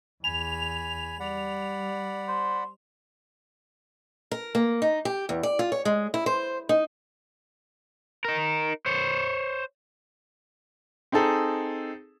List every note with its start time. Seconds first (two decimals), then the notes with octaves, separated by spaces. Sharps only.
0.24 E2 G#5 B5 F7
1.20 G3 D5 F#5 B5
2.28 C5
4.32 A#4
4.55 A#3
4.82 D#4
5.05 G4
5.29 E2
5.43 D5
5.59 F4
5.72 C#5
5.85 G#3
6.14 E4
6.26 C5
6.69 D#4
8.25 D#4 A#4
8.86 C5 C#5
11.12 C4 D#4 G#4 A4